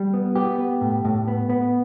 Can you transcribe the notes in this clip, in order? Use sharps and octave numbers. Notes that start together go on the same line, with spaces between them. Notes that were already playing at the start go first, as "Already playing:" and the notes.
Already playing: G3
B3
B3 G4
B3
A2
A2
B3
B3